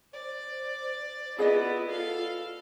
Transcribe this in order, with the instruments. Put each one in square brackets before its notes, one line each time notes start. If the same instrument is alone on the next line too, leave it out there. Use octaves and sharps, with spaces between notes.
[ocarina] C5 [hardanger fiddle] D5
[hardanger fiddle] B3 E4 [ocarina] F4 [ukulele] G#4 D5 D#5
[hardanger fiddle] A4 F5